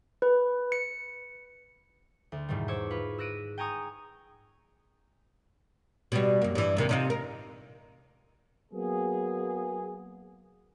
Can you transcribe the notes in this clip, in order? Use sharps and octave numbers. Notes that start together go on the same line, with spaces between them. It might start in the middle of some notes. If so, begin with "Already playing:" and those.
B4
C#7
D2
E2 G#2 B2 D#3 G3
C5 C#5 C#6 D6 E6
F4 B4
E6 F#6 A#6 D7 D#7
G5 G#5 A#5 C#6 D#6
B2 G3
F#2 A#3
G2 E3
D#2 C3 A#3
C3 D#4 F4
A#4
F#3 A#3 B3 G#4